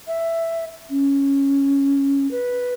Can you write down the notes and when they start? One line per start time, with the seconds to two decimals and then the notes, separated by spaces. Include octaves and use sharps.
0.07 E5
0.90 C#4
2.31 B4